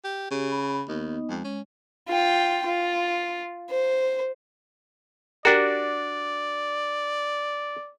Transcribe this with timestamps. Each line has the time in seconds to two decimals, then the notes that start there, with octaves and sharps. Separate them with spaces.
0.04 G4
0.31 C#3 G4
0.50 B5
0.89 D#2 B3 D#4 D#5
1.29 F2 G#3
1.45 C#4
2.08 F4 G5
2.66 F4
3.70 C5
5.45 D4 F#4 G4 A#4 D5